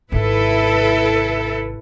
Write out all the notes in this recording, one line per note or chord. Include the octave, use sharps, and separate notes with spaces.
G#1 C3 E4 A4 B4